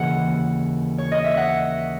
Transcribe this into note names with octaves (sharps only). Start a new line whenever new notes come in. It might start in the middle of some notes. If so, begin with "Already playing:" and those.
Already playing: D#2 C#3 E3 F#5
C#5
D#5
E5
F#5